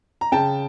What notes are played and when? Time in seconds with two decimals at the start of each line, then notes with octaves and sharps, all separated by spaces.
0.21 A#5
0.32 C#3 G5 A5